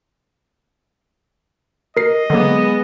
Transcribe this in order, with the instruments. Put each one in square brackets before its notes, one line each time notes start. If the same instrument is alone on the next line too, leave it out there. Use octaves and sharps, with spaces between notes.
[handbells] A#4 C7 [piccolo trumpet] D#5
[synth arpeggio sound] D3 F#3 A#3 [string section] G#3 B3